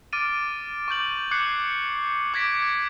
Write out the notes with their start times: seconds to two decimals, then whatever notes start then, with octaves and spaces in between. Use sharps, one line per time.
0.13 D6 F6 A6 D7 D#7
0.88 C#6 D6 G6 F#7
1.31 D6 F#6 G#6 C7 C#7 F#7
2.34 D6 G#6 A#6 B6 D7
2.62 G#6